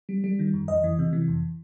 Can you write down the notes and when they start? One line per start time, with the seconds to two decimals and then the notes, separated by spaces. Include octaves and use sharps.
0.09 G3
0.24 G3
0.39 D#3
0.54 F#2
0.68 F2 D#5
0.84 E3
0.99 C3
1.13 E3
1.28 F2